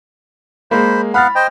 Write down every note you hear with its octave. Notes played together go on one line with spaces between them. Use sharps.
G#3 A#3 C5 B5
B3 F5 F#5 B5 F6 A6
C5 D#5 G5